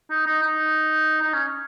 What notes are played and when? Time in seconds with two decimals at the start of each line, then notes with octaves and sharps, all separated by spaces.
0.10 D#4
0.26 D#4
0.43 D#4
1.22 D#4
1.34 C#4